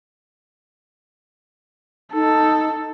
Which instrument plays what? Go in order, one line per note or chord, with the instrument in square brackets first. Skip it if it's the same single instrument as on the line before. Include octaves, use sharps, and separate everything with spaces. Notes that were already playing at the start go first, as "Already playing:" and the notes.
[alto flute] D#4 [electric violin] A4